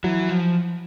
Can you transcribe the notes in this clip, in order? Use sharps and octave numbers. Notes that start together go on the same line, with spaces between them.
E3 F#3
F3